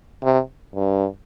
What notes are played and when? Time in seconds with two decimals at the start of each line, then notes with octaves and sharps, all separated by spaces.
0.23 C3
0.75 G2